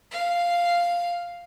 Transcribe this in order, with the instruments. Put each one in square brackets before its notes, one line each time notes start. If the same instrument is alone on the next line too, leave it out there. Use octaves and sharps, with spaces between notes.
[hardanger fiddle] F5